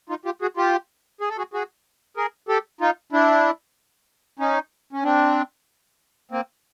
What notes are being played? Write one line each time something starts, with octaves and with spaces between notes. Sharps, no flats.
D#4 F4
F4 G4
F#4 G#4
F4 G4
G#4
A4
F#4 G#4
F#4 G#4
G#4 A#4
G4 A4
D#4 F4
D4 E4
C#4 D#4
C#4
C4 D4
A#3 C4